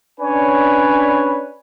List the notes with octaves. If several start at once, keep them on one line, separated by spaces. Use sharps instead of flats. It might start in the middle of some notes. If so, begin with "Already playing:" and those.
C#4 D4 B4 C#5 D5 G#5